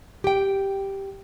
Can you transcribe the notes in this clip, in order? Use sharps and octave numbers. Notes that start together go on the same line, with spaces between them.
G4 G5